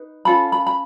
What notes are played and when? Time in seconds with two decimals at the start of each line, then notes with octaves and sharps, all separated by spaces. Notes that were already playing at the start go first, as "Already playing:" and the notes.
Already playing: D#4 B4
0.25 C#4 F4 A4 B5
0.52 B5
0.67 B5